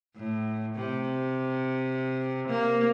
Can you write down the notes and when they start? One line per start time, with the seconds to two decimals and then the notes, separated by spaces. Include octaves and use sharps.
0.16 A2
0.75 C3
2.48 A#3